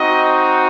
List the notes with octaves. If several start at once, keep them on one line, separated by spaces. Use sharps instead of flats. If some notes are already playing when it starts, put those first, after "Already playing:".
Already playing: C4 D#4 F#4 D#5